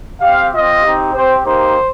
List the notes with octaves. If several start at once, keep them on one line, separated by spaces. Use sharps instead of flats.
C4 G4 F5
C4 F4 D#5
C4 D#4 G4
C4 G4 C5
A#3 D#4 G4 C5